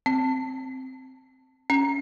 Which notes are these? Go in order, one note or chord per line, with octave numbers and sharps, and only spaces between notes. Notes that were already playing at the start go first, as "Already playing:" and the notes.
C4
C#4